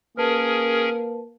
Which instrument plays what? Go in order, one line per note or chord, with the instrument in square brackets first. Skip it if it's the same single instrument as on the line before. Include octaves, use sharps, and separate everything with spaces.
[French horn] A#3 [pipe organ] C#4 G#4 A#4 [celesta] B4 A5